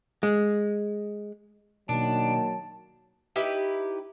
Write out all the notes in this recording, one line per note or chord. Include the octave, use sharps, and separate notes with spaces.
G#3
B2 D#3 F#3 A#3 D4 A5
D#4 E4 G4 B4